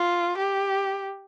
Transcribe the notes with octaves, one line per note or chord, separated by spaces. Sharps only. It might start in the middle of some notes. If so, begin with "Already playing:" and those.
Already playing: F4
G4